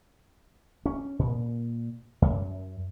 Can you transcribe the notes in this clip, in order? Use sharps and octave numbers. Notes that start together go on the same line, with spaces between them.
C#4
A#2
F#2